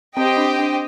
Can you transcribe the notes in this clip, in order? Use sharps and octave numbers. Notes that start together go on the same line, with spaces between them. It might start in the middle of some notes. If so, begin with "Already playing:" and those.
C4 G4 C5 D#5 G5
D4
D4